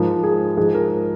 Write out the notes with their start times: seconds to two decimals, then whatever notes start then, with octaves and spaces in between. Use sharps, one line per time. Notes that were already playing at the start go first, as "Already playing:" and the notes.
Already playing: G#2 F3 A#4
0.24 G#4
0.57 G#2 F3 G#4
0.74 A#4